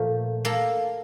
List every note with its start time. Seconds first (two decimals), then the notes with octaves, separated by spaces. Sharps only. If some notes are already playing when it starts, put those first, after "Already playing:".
Already playing: A#2 F3 A3
0.45 A#3 A4